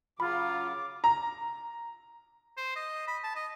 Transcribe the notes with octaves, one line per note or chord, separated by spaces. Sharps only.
C#3 F#3 F4 B5 D6
A#5
C5
D#5
B5
A5
D#5